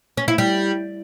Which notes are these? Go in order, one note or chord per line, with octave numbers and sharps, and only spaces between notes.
C#4
E4
G3